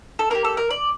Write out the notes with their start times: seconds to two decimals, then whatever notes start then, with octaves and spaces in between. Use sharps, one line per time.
0.19 A4
0.30 A#3 D4 A#4
0.35 G4
0.44 A4
0.57 A#4
0.70 D5